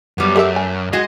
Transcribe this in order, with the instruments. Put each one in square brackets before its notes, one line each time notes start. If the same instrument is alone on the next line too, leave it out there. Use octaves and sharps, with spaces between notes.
[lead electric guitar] F#2 [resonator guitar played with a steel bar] G3 B3
[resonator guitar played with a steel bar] A3 [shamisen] G4 A#4 E5
[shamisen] G#5
[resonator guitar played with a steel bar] G#3 F#4 [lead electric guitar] D#5